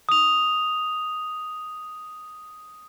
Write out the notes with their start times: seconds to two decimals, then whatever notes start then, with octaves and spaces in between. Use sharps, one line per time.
0.09 D#6 F7